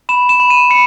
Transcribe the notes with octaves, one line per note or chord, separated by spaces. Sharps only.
B5 E7
E7
B5
D#7
B5 C#7